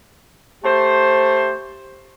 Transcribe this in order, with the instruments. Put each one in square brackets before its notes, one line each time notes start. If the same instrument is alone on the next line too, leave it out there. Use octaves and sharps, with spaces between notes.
[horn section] A3 G4 C5